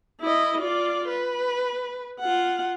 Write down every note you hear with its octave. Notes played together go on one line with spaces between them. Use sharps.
E4 D#5
F4 D5
B4
F4 F#5